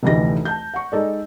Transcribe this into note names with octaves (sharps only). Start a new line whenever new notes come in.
F1 D2 E3 D#4 G4 A#6
A5 G6
F#5 C#6
G#3 D#4 A4 D5